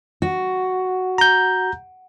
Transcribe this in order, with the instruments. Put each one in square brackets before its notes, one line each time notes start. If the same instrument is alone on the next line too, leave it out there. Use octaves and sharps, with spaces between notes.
[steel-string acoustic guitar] F#4
[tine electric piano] A#5 G6